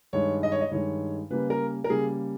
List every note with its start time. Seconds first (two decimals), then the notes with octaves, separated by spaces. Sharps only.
0.13 G2 D#3 G#3 C#5
0.43 D#5
0.52 C#5
0.61 D#5
0.71 G2 D#3 G#3 C#5
1.30 C#3 G3 A#3 B4
1.50 A#4
1.84 A#4
1.89 C#3 G3 A#3 G#4